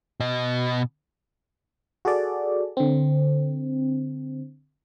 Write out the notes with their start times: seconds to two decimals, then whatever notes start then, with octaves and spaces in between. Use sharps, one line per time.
0.20 B2 D#5
2.05 F#4 G#4 A4 D5
2.77 D3 C4